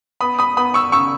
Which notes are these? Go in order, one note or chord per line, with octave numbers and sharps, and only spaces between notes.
B3 B5 D#6
B5 D#6
B3 B5 D#6
C#6 E6
C#3 C#6 E6